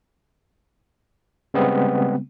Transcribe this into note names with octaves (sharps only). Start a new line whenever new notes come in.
C#3 G3 G#3 B3 C4